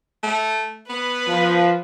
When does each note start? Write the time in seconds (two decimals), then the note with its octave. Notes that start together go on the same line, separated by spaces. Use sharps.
0.23 A3
0.89 B3 B4
1.28 F3